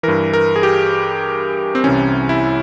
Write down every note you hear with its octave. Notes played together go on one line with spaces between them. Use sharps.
G2 E3 A#4
A#4
G#4
G4
C4
C2 C3 E3 C#4
E4